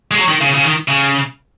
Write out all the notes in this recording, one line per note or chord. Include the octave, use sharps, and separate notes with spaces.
G#3
F#3
D#3
C#3
C#3
D#3
C#3